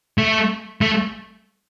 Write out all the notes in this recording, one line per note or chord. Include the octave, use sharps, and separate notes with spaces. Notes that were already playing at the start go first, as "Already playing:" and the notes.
A3
A3